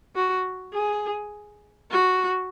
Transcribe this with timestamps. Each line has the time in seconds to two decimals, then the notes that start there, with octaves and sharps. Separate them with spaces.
0.15 F#4
0.73 G#4
1.92 F#4